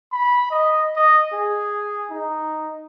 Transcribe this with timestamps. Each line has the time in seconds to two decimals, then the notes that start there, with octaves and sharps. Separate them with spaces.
0.12 B5
0.51 D#5
0.96 D#5
1.33 G#4
2.10 D#4